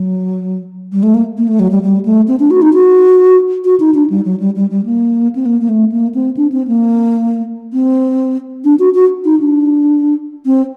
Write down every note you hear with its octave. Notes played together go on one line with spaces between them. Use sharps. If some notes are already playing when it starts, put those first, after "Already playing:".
Already playing: F#3
G3
A3
A#3
A#3
A3
F#3
G3
G3
A3
C4
D4
F#4
D#4
F#4
F#4
D#4
D4
G3
F#3
G3
G3
G3
A#3
C4
A#3
A#3
A3
A#3
C4
D4
C4
A#3
C4
D4
F#4
F#4
D#4
D4
C4